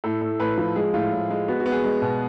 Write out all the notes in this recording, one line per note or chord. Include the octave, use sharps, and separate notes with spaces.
A2 A4
A2
A2 B4
F3
G#3 G#4
A2 F4
A2
G#3
B3 F#4
F#4
B3
G#4
G#3
B2